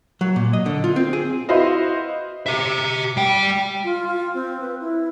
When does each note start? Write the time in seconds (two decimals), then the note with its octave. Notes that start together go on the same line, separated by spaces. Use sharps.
0.21 F#3
0.36 A#2
0.53 D#5
0.66 D3
0.84 F4
0.96 C4
1.13 G#4
1.48 E4 F#4 B4 C5 D#5 F5
2.46 G4 E5
3.17 G3 G5
3.84 F4
4.07 F4
4.34 C4
4.61 B4
4.81 E4